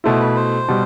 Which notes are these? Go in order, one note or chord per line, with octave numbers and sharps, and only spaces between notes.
B2 A3 E4 C5
B4
C5
B2 G3